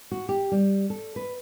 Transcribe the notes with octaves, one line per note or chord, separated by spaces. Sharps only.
F#4
G4
G3
A4
B4